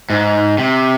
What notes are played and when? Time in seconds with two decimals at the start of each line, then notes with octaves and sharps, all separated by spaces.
0.10 G#2
0.58 C3